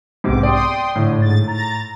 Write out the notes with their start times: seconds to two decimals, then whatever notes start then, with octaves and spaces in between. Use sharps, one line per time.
0.24 B1 G#2 C3 B3 D6
0.43 D5 G5 C6 D#6
0.96 A2 D3
1.18 G#2 A6
1.47 A#5 A6